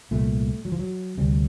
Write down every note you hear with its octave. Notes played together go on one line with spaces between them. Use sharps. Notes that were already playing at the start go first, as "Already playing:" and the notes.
C2 A#2 A3
F#3
F3
F#3
D2 C3 G3